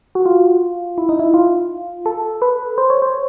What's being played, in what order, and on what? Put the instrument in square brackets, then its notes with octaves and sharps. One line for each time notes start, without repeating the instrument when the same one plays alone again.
[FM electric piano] F#4
F4
E4
D#4
E4
F4
A4
B4
C5
C#5
C5